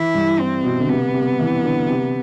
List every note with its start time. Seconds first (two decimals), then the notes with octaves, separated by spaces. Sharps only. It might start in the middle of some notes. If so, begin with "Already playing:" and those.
Already playing: E3 E4
0.14 G2
0.39 C4
0.64 B2
0.80 D3
0.89 C3 B3
1.14 C3
1.39 E3
1.64 D3
1.89 C3